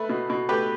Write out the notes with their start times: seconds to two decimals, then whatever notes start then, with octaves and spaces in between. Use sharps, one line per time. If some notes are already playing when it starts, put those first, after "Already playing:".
Already playing: A3 B4 E5
0.09 B2
0.30 B2
0.49 A3 G4 B4